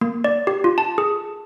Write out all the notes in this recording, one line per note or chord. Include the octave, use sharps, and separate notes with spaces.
A#3
D5
G4
F4
A5
G#4